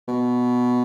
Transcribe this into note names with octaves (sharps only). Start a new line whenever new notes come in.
B2